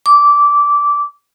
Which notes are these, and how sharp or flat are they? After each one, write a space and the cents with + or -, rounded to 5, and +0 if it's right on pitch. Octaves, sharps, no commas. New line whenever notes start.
D6 -15